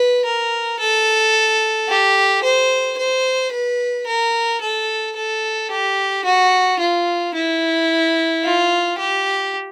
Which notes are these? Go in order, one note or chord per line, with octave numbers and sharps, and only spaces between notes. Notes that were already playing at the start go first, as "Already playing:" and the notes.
Already playing: B4
A#4
A4
G4
C5
C5
B4
A#4
A4
A4
G4
F#4
F4
E4
F4
G4